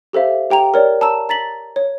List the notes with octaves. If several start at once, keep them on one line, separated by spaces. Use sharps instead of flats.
G4 A4 C5 E5 F5
G4 G5 A#5 F7
A#4 C#5 D5
A5 A#5 E6 E7
A#5 A6 B6 F#7
C#5